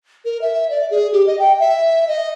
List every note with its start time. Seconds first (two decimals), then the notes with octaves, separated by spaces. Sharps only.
0.25 A#4
0.42 E5
0.70 D5
0.91 G#4
1.13 G4
1.27 D#5
1.39 G5
1.60 E5
2.08 D#5